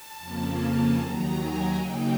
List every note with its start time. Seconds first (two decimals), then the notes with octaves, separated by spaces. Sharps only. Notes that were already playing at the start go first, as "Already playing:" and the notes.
Already playing: A5
0.19 F2 C#3 F3 A#3 C#4
0.96 D#2 D#3 F#3 A#5
1.35 G#5
1.73 C#3 F#3 A#3 D#4 G5